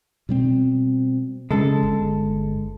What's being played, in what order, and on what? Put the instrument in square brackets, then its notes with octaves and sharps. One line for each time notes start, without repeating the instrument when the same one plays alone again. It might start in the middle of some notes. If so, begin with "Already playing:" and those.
[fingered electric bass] B2 G3 C4
[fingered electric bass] C#3 G3 C#4 [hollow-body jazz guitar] G#3 A4
[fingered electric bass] G1